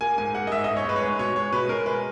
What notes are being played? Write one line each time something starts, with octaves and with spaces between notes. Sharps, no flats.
A#3 G#5
G#2 G#5
A#3 F#5
D#5
G#2 E5
D#5
G#2
C#5
G#2 B4
C#5
G#3 B4
B2 C#5
G#3 C#5
B2 B4
G#3 A#4
G#3 B4